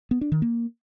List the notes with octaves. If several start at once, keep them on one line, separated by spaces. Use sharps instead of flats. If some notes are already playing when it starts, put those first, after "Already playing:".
B3
D4
D#3
A#3